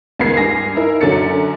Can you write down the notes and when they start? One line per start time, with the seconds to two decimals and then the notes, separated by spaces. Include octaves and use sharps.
0.19 C#2 D#3 B3 B4 G#6 C7
0.37 G2 G#5 A#6
0.75 D#4 E4 A#4
1.01 F#2 D3 F#3 A6 C#7